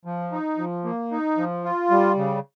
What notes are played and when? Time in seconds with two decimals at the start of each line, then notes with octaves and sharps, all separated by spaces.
0.05 F3
0.32 D#4
0.58 F3
0.84 A#3
1.11 D#4
1.37 F3
1.64 F4
1.91 G3
2.17 C#3